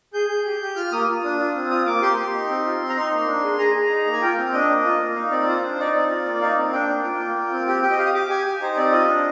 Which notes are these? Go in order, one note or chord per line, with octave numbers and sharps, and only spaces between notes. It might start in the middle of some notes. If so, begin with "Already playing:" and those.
G#4 G6
G#4
G4
G4
F4 F6
A#3 D#6
F4
D4
F4
C4
F4 D#6
A#3 D6
G4 C6
G4
D#4
C4
F4
C4
A#5
D#4 C6
A#3
D4
G#4
G#4 A#5
G#4
D#4
A#3
G#5
F4 G5
C4
D4 D#5
A#3
F4
A#3
D#4 F5
C4 D5
F4 C5
D4
D#4 D5
C4
F4
A#3
D#4 F5
C4
D4 G5
A#3
F4
A#3
F4
C4
G4 G5
G4 G5
D#5
G4 F5
D#6
G4 D6
G4 G#5
G4
D#4 C5
C4 D5
F4 D#5
D4